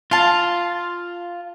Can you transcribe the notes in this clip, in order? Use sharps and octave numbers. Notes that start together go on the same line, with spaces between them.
F4 F5 A5